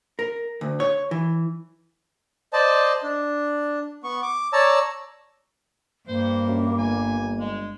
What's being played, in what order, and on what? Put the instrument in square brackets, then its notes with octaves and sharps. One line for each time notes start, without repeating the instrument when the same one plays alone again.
[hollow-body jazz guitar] A#4
D2
C#5
E3
[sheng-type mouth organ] C5 D5 D#5 A5
D4
B3 C#6
D6
C#5 D5 A5 A#5 E6
[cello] G2 [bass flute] A#3 [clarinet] C5
[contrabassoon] F#2
[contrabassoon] G1 [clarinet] G#5
[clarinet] G#3